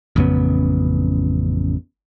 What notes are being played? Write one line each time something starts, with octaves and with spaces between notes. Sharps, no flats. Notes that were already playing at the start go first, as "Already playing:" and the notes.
A1 F2 C#3 B3